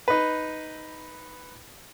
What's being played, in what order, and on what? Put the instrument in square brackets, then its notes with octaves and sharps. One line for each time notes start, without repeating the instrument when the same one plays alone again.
[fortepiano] D#4 B4